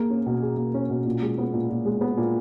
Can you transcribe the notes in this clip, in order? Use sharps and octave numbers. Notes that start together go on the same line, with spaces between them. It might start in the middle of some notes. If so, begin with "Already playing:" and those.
Already playing: A#3 G#4
C#4
B2
G#4
A#3
C#4
B2
A#2
G#3
B3
A#2
A#2
G#3
B3
A#2